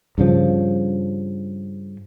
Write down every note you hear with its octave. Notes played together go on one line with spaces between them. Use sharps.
G2 C#3 F3